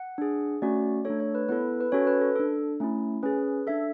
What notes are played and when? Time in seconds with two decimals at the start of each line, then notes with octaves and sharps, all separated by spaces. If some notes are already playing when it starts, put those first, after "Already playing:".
Already playing: F#5
0.18 D4 G#4
0.62 A3 C#4 F#4 D5
1.05 A3 D4 A4 C#5
1.20 C#5
1.35 B4
1.49 B3 E4 A4 B4
1.80 B4
1.92 C#4 F#4 A4 C#5
2.07 B4
2.21 A4
2.36 D4 A4
2.80 A3 C#4 E4
3.23 C#4 G#4 B4
3.67 D4 A4 E5